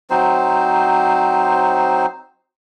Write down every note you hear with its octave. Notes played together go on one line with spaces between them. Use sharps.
F#3 C4 D#4 C5